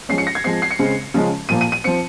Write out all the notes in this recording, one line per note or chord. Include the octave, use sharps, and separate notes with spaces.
F3 G#3 C#4 C7
C#7
A#6
G#6
F3 G#3 C4 C7
C7
C#7
C#3 G#3 C4
C#3 F3 G#3 C#4
A#2 F3 A#3 D#7
D#7
D#7
F3 C4 C#7